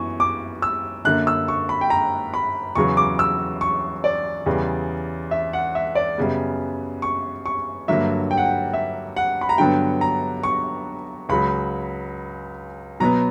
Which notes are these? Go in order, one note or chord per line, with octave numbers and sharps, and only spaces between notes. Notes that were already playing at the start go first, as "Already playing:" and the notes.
Already playing: F#2 E3 B3 C#6
D6
E6
F#2 D3 A#3 F#6
E6
C#6
B5
G5
A#5
B5
E2 C#3 F#3 C#6
D6
E6
C#6
D5
E2 C#3 G3
E5
F#5
E5
D5
F#2 C#3 G3 B3
C#6
C#6
G2 D3 F#3 A#3 E5
G5
F#5
G5
E5
F#5
B5
A#5
G2 D3 F#3 B3 G5
A#5
C#6
C#2 C#3 F#3 B5
B2 F#3 B3 A#5